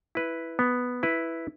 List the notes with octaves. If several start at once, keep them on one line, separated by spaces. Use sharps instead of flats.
E4 B4
B3
E4 B4